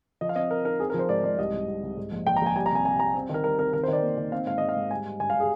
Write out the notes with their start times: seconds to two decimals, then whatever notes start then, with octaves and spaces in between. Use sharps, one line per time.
0.21 F3 D#5
0.29 F5
0.36 C4 D#5
0.51 C4 A#4
0.65 D#4 A#4
0.79 C4 G#4
0.90 A#4
0.94 F3
0.99 C5
1.09 G#2 D5
1.24 G#2 D5
1.38 C2 D#5
1.53 C2
1.68 C2
1.83 C2
1.97 G#2
2.12 A#1
2.26 A#1 G5
2.36 A#5
2.42 A#1 G#5
2.56 G3 G#5
2.66 A#5
2.71 C3 G#5
2.85 C3 G#5
2.99 G3 A#5
3.15 C4
3.29 D#3 A#4
3.44 G3 A#4
3.59 C4 A#4
3.73 D#3 A#4
3.83 C5
3.88 D#3 D5
4.03 A#3
4.17 D#3
4.32 C4 F5
4.47 G#2 F5
4.58 G#2 D#5
4.69 F5
4.76 G#2
4.91 G3 G#5
5.06 G3
5.20 G2 G#5
5.30 F5
5.35 G3
5.40 G#4